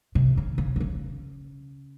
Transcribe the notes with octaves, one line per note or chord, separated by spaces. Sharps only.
C3
C#3
C#3
D3
C#3